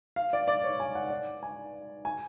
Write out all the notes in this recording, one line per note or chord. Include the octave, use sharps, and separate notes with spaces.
F5
D5
D5
C#5
G#5
F#5
D5
G#5
G#5